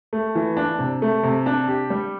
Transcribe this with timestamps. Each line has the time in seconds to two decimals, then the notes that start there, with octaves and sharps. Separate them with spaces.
0.13 A3
0.35 E3
0.57 D4
0.79 C3
1.02 A3
1.23 C3
1.46 D4
1.68 G4
1.90 G3